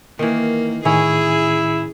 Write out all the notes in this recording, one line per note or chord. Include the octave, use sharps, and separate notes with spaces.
D#3 E3 A#3
A2 D#3 C#4 E4 G#4 G#5